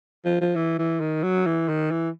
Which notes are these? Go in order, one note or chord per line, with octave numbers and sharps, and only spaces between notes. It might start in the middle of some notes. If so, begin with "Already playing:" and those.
F3
F3
E3
E3
D#3
F#3
E3
D#3
E3